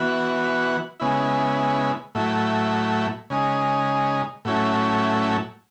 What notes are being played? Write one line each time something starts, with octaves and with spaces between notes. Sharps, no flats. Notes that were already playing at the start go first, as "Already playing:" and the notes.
Already playing: E3 B3 F#4
C#3 G#3 B3 E4
A2 F#3 A3 E4
C#3 G#3 D#4
A2 F#3 A3 C#4 E4